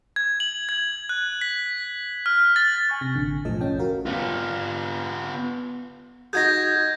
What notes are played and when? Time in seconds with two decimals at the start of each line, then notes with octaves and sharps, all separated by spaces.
0.16 G#6
0.40 F#7
0.69 G#6
1.09 F#6
1.41 B6
2.26 F6
2.56 A6
2.88 G#5 C#6 F6
3.01 C3 A#6
3.15 A1 D3
3.45 B1 F2 A2 F3 A4 D#5
3.61 A1 C#4 G5
3.79 F#4 A#4 F5
4.06 B3 F4
6.33 D#4 F#4 G#4 G6 G#6 A#6